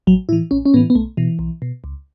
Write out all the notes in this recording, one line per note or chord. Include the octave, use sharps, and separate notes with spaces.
A1 F#3
A2 E3 E4
A1 C#4
C#4
A2 E3 B3
B3
B1 A3
B2 E3
B1
B2
C#2